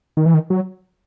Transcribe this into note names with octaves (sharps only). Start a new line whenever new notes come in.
D#3
E3
D#3
F#3